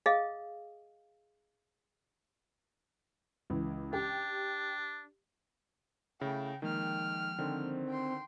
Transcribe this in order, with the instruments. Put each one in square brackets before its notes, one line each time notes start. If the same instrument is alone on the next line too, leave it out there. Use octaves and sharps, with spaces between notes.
[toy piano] G#4 D#5 F5 D#6
[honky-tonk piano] C#2 E3
[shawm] D4 [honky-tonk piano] G4
[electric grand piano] C#3 [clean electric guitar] A3 E4 [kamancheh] G5
[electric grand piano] D#3 [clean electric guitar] F3 G#3 A#3 [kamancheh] G5 F6
[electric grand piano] D3 D#3 [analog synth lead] C4
[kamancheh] G5 C6